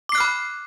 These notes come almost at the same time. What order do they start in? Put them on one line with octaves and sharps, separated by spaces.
D6 C7 F#6 F6 B5